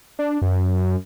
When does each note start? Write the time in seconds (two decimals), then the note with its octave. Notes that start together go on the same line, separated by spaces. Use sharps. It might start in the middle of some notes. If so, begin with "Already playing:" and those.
0.19 D4
0.42 F#2